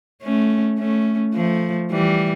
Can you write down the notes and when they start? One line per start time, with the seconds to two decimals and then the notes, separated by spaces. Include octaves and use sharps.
0.23 A3 C#4
0.79 A3 C#4
1.34 F3 A3
1.91 E3 G3